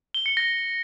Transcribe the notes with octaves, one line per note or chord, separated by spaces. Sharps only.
G7
C#7
A#6